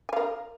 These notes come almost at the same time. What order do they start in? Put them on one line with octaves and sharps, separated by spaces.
G#5 F5 A#4